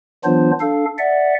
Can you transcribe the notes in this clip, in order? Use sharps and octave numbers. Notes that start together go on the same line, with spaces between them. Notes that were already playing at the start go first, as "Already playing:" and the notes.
E3 F#3 B3 D4 F4 C5
D4 A4 F5
D5 E5 F#5